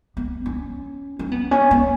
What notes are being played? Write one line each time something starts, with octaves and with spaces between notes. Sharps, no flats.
B3
C#4
C#4
B3
C#4
B3